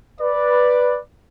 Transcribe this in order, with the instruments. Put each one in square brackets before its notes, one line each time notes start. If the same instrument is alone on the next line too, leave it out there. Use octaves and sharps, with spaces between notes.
[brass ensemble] B4 D5